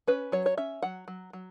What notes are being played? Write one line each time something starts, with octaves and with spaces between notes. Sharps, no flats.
C#4 B4
F#3 C#5
C#5
C#4 E5
F#3 F#5
F#3
F#3